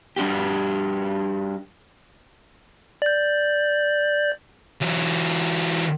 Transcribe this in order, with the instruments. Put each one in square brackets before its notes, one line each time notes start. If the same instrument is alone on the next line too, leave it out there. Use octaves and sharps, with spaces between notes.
[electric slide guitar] G3 D4 F#4 G4
[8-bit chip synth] D5 G6
[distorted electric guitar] E3 F#3